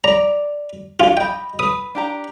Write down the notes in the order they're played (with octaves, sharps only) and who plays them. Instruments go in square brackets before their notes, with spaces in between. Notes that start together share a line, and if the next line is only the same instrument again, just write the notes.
[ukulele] D5 [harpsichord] A#5
[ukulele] D4 F#5 G#5 [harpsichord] F4
[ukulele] D#5 B5 [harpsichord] G5
[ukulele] B4 [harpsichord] D#6
[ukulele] D4 G4 A#5